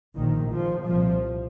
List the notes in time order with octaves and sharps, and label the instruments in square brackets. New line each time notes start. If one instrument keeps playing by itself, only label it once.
[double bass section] A#1 A#2 D#3
F3
C2 A#2 F3